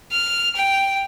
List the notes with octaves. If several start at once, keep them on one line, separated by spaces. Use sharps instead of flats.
F6
G5